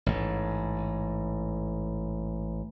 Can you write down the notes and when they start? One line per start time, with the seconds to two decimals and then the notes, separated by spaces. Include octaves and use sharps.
0.06 A1 G#2